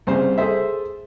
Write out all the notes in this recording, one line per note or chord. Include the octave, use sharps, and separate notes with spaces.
C2 C#3 C5 C6
G#4 A4 C5 E5